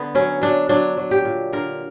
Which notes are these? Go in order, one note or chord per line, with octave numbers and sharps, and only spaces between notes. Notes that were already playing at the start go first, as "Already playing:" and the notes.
Already playing: D3 B3
F#3 C#4
F#3 D4
F#3 D4
F#3
G4
A#2
D3 A#4